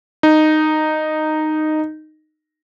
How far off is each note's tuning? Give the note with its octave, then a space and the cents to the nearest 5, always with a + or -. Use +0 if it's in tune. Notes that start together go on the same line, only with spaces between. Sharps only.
D#4 -10